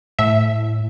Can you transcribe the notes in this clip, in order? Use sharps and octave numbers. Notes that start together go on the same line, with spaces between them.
A2 E5